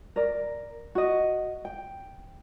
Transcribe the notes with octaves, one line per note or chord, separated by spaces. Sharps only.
A#4 D5
F#4 D#5
G5